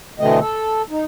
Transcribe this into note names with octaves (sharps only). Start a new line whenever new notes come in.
B2 D3 E3 A3 C4 D#5
A4
D#4